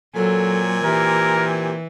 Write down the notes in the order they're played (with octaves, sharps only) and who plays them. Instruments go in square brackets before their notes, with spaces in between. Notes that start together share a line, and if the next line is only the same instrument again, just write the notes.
[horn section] A#2 C4 G#5 [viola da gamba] F#3 [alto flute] A4
[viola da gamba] E3 [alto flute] G4 [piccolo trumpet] A#4